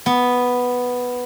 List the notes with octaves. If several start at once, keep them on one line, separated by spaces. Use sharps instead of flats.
B3